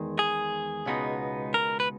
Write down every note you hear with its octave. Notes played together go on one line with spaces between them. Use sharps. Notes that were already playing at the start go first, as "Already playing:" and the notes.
Already playing: E2 D#3 G#3
G#4
C#2 B2 G#3 B3 D#4
A#4
B4